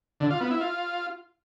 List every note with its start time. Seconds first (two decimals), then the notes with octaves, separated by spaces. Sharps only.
0.20 D3
0.30 F4
0.41 B3
0.51 E4
0.61 F4